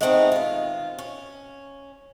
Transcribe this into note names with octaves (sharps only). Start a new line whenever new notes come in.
G#3 A3 B3 C4 D4 D#4
D#3 F4
C#4